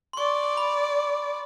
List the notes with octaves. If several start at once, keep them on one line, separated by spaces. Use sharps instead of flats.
C6
D5 C#6
B5